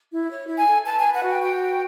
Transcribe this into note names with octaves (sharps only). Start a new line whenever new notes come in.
E4
C#5
E4
G#5
A4
B4 A5
G#5
B4
F#5
F#4 G5
F#4 G5
B4